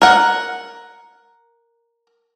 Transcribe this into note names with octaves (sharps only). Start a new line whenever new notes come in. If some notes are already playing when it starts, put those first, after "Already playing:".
A#4 F#5